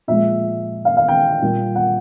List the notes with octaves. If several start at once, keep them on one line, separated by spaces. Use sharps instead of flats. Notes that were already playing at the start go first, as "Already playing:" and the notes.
A#2 F3 G#3 E5
F5
F5
G5
A#2 G3 A#3
F#5